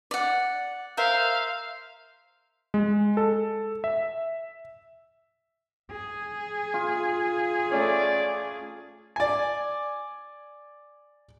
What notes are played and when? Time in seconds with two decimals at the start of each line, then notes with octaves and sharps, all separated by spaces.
0.11 D5 F#5
0.97 A#4 C5 E5 F5
2.74 G#3
3.17 A4
3.84 E5
5.90 G#4
6.74 F4
7.72 A3 C#4 D5
9.16 D5 G#5